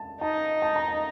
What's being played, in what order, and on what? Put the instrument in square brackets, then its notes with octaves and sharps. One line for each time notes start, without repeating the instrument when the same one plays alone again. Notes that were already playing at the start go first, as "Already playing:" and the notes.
Already playing: [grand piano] A5
[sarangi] D#4 [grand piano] A5
[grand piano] A5
A#5
A5